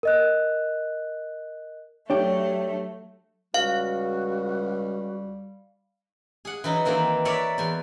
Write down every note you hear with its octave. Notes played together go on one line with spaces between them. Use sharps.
A#4 D#5 F#6
F#3 A3 D4 G4 C#5
C#2 G3 F#4 F5
G#4 F#5
E3 F#3 D#4 E4
D#3 E3 A#3 C4
A#4 B4 C#5 D5 E5 B5
E2 G#5 C6